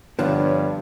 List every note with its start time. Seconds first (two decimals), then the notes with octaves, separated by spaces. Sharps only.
0.19 G2 D3 F3 B3 C#5